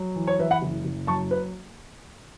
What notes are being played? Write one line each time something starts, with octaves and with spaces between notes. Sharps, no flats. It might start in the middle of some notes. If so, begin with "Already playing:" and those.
Already playing: F#3
E3
C#5
E3 B4 E5
F#5 B5
F#1
F#1
F#3 A5 C#6
B4